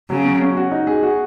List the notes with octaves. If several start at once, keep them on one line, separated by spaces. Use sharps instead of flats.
C#3 F#3
C#4
C#4
F#4
D#4
G#4
F#4